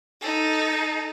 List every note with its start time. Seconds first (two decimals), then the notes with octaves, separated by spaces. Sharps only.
0.20 D#4 A4